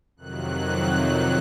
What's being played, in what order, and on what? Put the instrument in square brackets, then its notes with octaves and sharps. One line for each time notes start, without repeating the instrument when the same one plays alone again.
[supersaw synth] F2 C3 D#3 F#3 F#6